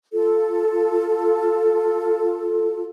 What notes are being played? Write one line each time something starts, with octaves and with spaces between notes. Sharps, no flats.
F4 A4